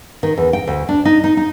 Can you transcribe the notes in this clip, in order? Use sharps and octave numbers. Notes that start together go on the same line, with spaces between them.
D#3
E2
G5
D2
D4
D#4
D#4
D#4